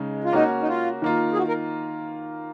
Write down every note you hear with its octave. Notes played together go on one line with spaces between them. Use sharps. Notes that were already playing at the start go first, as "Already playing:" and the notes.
Already playing: C#3 G#3 D#4
F4
A#3 C#4 D#4 F#4
D#4
F4
D#3 A#3 F4
G#4
F#4
A#4